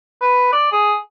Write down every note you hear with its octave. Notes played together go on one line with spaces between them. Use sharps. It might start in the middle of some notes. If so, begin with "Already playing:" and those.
B4
D5
G#4